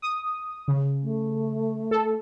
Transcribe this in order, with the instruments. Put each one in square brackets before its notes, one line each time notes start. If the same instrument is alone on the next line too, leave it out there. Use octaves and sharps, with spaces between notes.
[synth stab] D#6
C#3
[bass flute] A3
[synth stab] A4